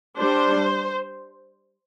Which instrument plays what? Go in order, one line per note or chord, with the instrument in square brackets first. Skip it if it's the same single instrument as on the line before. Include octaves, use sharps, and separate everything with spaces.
[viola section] G3 D4 C5